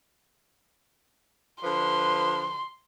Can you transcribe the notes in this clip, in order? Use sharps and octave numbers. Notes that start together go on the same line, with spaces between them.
D3 F3 B4 C6